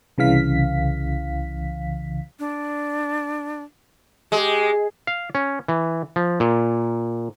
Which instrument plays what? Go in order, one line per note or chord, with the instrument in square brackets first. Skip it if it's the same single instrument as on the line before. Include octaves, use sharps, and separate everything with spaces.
[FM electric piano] C2 C#3 E3 F5 B6
[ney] D4
[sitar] G#3 [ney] G4
[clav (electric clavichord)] F5
C#4
E3
F3
A#2